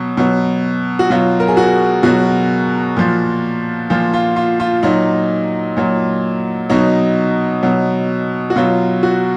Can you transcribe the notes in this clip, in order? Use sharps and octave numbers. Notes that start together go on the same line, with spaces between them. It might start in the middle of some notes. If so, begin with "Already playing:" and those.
Already playing: B2 F#3
B2 F#3
F#4
B2 F#3 F4
A#4
G#4
F#4
B2 F#3 F#4
A#2 F3
A#2 F3 F4
F4
F4
F4
A#2 F#3 D#4
A#2 F#3
B2 F#3 D#4
B2 F#3
F#4
B2 F#3 F4
F#4